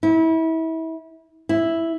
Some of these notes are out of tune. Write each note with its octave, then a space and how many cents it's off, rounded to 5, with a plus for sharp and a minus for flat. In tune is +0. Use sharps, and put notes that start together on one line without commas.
E4 -30
E4 +0